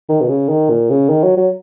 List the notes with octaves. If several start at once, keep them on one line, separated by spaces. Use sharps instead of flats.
D#3
B2
C#3
D#3
A#2
C#3
D#3
F#3
F#3